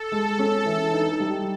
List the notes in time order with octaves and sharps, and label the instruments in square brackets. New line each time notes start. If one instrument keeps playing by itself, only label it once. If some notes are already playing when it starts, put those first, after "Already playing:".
Already playing: [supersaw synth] A4
[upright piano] G#3
C#4
E3
D#4
G3